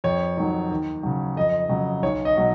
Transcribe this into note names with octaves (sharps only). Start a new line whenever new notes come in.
F2 C#5
D#3 F#3
D#2
C#3 F#3
F2 D#5
C#3 F#3
B1 C#5
D#5
B2 F#3